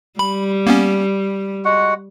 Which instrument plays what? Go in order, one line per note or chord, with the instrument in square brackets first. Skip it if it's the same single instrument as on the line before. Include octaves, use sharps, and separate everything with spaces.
[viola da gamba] G3 [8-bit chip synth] B5
[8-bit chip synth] A#3 B3 C#4
[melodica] G#3 F#4 F#5